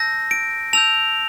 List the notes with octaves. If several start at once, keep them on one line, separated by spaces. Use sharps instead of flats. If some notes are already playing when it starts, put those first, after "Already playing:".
Already playing: A5 E6 G6 A#6
D7
A5 E6 G6 F7